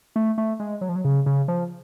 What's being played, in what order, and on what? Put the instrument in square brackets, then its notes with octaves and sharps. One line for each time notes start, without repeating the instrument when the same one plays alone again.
[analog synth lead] A3
A3
G#3
F#3
F3
F#3
C#3
C#3
F3